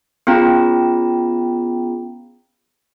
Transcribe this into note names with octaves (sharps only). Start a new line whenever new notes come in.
B3 C#4 F4 G#4 G5 A#5